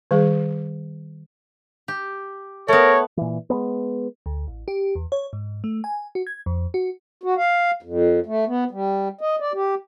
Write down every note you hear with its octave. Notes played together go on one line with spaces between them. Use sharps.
D#3 G3 G#4
G4
A3 B3 A#4 C#5
A#2 E3
G#3 A#3 B3
D2
A1
G4
E2
C#5
G#2
A3
G#5
F#4
G#6
F2
F#4
F#4
F5
F2
A3
B3
G3
D#5
D5
G4